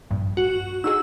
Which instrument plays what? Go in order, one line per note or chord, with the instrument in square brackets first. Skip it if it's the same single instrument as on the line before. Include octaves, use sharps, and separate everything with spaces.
[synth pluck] A#1 G2
[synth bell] F#4
[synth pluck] D#4 F#4 G#4 [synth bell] E6